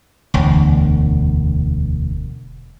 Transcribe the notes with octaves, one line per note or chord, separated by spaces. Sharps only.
E1 D2